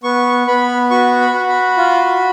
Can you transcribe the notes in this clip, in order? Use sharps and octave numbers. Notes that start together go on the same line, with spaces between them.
B3 C#6
B3 B5
F#4 C#6
B5
F#4
B5
F4